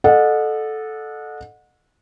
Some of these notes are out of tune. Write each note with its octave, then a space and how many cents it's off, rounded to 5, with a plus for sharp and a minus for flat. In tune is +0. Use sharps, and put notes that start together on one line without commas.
A4 -10 D#5 -35 F#5 -25